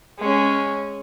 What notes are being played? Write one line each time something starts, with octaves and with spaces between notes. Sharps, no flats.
G#3 C#4